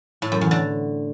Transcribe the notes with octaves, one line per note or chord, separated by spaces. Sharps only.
A2
F#2
E2
D3